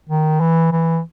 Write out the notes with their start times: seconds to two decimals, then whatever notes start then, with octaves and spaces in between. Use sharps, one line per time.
0.10 D#3
0.40 E3
0.72 E3